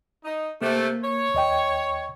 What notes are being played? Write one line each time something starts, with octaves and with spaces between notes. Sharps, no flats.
D#4
C3 A3 A#3
C#5
D#2 D#5 G5